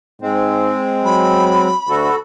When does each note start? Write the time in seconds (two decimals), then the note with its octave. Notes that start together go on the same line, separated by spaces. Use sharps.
0.22 G#2 G#3 C4
1.05 F#3 B5
1.89 D2 F#4 A4